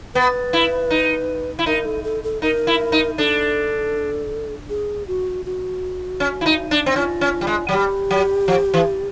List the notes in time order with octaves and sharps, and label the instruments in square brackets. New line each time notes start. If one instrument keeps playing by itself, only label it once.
[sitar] B3 [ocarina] B4
[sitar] E4
D#4
E4
[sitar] D#4 [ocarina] A#4
[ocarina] A4
A4
A4
[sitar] D#4 [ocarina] A#4
[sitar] E4
D#4
[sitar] D4 [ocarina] A4
[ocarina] G#4
F#4
F#4
[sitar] C#4
E4
D#4
D4
C4
[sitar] C#4 [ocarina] F4
[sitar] C#4
G3
G#3
F#3
[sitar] G3 [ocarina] G4
[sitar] F#3
F3
E3